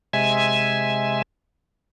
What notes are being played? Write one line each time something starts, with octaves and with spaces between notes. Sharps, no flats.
C3 G#3 E5 G#5